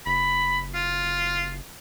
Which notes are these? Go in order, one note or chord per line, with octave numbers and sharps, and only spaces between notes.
F#1 B5
F4